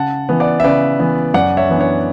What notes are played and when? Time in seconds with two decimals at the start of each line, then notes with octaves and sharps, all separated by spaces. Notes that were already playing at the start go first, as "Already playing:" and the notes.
Already playing: C#3 F#5 A5
0.29 E3 B3
0.40 D5 F#5
0.60 E5
0.64 C#3 B4 D5
0.99 E3 B3
1.34 F#2 D5 F#5
1.57 C#5 E5
1.69 E3 B3 D4
1.81 C#5